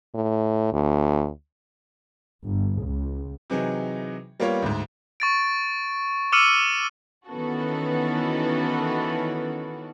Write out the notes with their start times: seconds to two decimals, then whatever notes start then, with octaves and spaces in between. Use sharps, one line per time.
0.15 A2
0.73 D2
2.45 G1
2.82 C#2
3.50 C3 E3 F#3 D#4 G#4
4.40 G3 A#3 B3 F4 A#4 C#5
4.62 D2 G#2
5.20 C#6 A6 D7
6.32 D6 E6 F6 C#7 D#7 F#7
7.28 D#3 E3 B3 C#4 F#4 A4